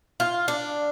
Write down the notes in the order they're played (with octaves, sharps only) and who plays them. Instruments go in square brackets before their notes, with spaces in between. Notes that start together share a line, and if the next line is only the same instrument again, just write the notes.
[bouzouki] F4
D4